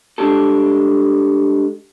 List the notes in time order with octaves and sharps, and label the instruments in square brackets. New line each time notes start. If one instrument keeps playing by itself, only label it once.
[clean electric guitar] G#3 D4 G4 A4